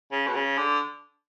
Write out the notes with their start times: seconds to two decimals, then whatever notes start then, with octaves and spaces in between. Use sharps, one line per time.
0.12 C#3
0.27 B2
0.35 C#3
0.58 D3